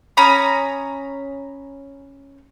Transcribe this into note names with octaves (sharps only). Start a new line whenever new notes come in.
C#4 A#5 B5 D#6